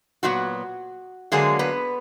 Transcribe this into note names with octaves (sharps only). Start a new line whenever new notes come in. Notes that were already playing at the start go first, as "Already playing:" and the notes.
A#2 F#3 B3 F#4
D3 F#3 G#3 A#3 D4 G#4
B3 B4